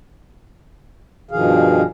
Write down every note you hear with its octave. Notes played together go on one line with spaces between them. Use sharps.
G2 B2 D#3 F3 G#4 F5